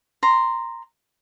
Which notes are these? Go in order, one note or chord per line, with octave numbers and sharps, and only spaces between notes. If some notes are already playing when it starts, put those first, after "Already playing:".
A#5 C6